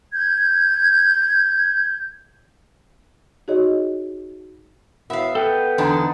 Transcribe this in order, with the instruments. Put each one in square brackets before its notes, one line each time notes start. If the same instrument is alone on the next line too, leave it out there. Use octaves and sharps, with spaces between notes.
[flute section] G6 G#6
[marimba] D#4 F#4 G#4 C#5 D#5
[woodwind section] F#2 A2 [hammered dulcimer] B3 [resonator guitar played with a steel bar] E5 F5
[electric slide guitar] A4 B4 [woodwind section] G5
[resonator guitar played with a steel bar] E2 D3 D4 [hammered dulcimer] B3 D#4 C5